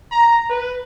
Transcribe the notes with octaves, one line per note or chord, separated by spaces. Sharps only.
A#5
B4